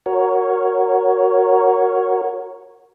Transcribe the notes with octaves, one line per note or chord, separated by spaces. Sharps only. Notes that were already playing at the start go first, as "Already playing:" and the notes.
F#4 A#4 C#5